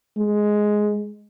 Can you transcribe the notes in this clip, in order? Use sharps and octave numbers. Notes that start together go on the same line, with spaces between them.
G#3